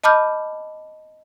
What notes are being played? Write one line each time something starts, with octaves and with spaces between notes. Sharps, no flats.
D#5 A5 B5 D6 F6 G6